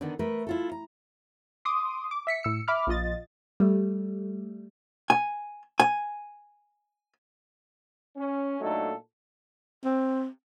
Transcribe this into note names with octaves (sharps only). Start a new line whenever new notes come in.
D3 D#3 B3 D4 D#4
A3 A#4 B4
E4 F4 A4
A#5
C6 D6 D#6
D6
E5 B6 C#7
A2 E6 C#7
E5 B5 D6 F6
A#1 F3 F4 D#5 A6
G3 A3
G#5
G#5
C#4
A#2 F#3 A3 D4 D#4 A4
C4